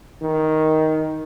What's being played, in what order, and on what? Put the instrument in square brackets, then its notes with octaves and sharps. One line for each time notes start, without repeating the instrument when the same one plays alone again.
[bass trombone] D#3